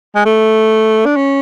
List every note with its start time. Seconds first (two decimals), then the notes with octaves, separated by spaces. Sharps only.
0.16 G#3
0.25 A3
1.06 D4
1.16 C#4